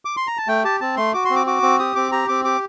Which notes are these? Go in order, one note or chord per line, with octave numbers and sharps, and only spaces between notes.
D6
C6
A#5
A5
A3 G5
G4 A5
C4 A5
A3 C6
F#4 D6
C6
C4
D6
F#4 D6
C4
G4 D#6
C4 D6
G4 A#5
C4 D6
G4 D6